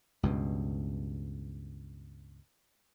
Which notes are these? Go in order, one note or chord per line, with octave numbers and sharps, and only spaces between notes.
C#2 G2 B2